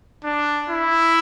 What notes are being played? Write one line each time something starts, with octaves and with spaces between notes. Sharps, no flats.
D4
E4